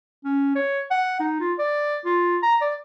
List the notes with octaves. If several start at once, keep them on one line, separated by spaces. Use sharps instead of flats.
C#4
C#5
F#5
D#4
F4
D5
F4
A#5
D5